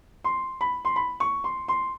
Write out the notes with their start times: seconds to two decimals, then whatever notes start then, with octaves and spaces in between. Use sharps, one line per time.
0.24 C6
0.61 B5
0.85 C6
0.96 B5
1.20 C#6
1.44 C6
1.68 C6